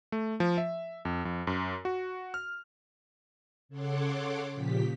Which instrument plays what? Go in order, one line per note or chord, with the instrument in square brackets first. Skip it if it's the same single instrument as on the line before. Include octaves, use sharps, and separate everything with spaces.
[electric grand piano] A3
F3
E5
F2
F2
F#2
F#4
F6
[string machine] C#3 A4 C#5 F#5 C6 D6
A#2 C#3 F3 G4 B6